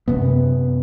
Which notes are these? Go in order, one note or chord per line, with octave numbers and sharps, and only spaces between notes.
F#2 C3 B3